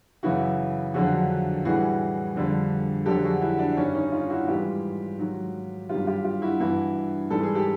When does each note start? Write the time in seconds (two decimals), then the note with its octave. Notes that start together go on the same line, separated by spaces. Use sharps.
0.23 F#2 C#3 E3 E4 F#4
0.94 F2 D3 F#3 F#4 G#4
1.65 A2 E3 G3 F#4 G#4
2.35 F2 D3 G3
3.06 F2 D3 F#3 G4 A4
3.24 F#4 G#4
3.42 E4 F#4
3.59 D4
3.77 G2 D#3 G3 C#4
3.95 C#4 D#4
4.12 D#4 F4
4.30 E4 F#4
4.48 G#2 E3 G3 F4 G4
5.18 G#2 D#3 F#3
5.89 G2 D#3 F#3 F4 G4
6.07 F4 G4
6.24 F4 G4
6.42 E4 F#4
6.60 G2 E3 G3 E4 F#4
7.30 G#2 E3 G3 A4
7.43 G#4
7.55 G4 A4